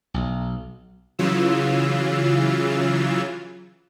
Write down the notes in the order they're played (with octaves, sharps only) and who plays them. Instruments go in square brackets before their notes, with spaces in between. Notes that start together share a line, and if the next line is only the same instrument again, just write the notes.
[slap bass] B1
[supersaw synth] C#3 E3 F#3 F4 E6